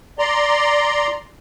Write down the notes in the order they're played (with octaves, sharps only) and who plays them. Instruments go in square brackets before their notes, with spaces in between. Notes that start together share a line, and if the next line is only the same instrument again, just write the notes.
[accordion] D5 A#5 C6